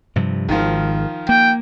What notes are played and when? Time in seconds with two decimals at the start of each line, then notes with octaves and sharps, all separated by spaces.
0.16 G2 C3 F3
0.48 G#1 D#3 F3
1.29 A#3 G5